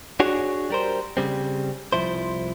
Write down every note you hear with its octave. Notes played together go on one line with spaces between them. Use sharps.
D4 F#4 G#4 C#5
G3 A#4 C5
C#3 G3 C4
C2 F2 F3 E4 C5